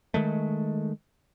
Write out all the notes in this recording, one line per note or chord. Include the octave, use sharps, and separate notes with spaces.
D#3 G#3 A3